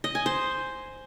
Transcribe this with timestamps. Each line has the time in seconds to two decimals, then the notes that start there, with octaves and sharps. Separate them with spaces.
0.04 D#5
0.15 G#5
0.26 C5